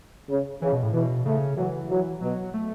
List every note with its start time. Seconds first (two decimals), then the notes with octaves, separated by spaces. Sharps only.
0.29 C#3
0.62 C#3 E3
0.72 B2
0.83 A2
0.93 B2 E3
1.25 C#3 A3
1.57 E3 F#3
1.90 F#3
2.21 B2 F#3
2.54 A3